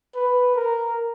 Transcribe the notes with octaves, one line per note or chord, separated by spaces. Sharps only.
B4
A#4